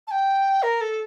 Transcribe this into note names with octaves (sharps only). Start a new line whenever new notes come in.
A5
G5
A#4
A4